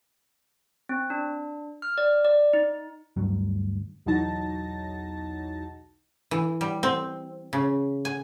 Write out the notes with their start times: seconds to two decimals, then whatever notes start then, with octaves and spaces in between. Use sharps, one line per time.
0.89 C4
1.10 D4
1.82 F6
1.98 D5
2.25 D5
2.53 D#4
3.17 D2 G2 F#3
4.06 B1 E2 F#3 D#4 A5 A#6
6.31 E3
6.61 G3
6.83 C4
7.53 C#3
8.05 G#5